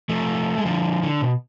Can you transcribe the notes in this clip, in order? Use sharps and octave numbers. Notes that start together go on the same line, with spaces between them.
F3 A3
G#3
D3 F3
D3
B2